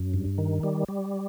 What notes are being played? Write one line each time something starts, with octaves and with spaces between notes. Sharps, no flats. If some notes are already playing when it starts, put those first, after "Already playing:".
Already playing: F#2
G2
D#3
G3
G3